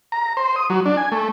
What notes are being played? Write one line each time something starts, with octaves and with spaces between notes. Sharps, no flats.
A#5
C5
D#6
F#3
D4
G#5
A3